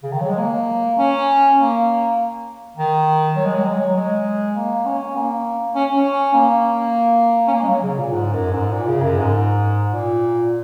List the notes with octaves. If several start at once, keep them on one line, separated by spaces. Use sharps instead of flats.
C#3
D#3
F#3
G#3
A#3
C#4
A#3
D#3
F#3
G#3
F#3
G#3
F#3
G#3
A#3
C#4
A#3
C#4
C#4
A#3
C#4
A#3
G#3
F#3
C#3
A#2
G#2
F#2
G#2
A#2
C#3
F#2
G#2
A#2